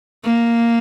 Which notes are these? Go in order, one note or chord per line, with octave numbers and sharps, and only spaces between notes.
A#3